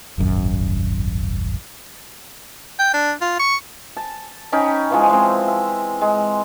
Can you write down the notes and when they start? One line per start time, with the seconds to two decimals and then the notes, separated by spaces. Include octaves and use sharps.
0.18 D#1 G#1 F#2
2.79 G5
2.94 D4
3.21 F4
3.40 C#6
3.97 A5
4.52 C#4 D#4 G5 B5
4.90 E3 F3 G#3
5.09 G#3 C4
5.48 E5
6.01 G#3